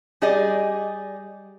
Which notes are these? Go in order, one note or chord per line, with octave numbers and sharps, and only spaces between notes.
G3 G4 G#4 D5 D#5